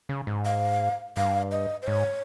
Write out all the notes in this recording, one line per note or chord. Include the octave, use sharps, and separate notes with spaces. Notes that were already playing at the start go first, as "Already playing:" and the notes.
C#3
G#2
F5
G2 F5
D#5
C5
G#2 C#5